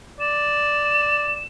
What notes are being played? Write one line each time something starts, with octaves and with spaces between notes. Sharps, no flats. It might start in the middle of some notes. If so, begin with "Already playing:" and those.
D5 E7